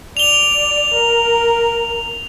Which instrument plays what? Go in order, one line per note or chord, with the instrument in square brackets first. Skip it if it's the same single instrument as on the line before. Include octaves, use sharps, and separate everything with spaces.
[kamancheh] D5 [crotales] F7 G7
[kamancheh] A#4